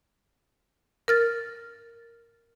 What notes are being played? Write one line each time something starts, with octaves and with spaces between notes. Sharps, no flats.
A#4 F6 A6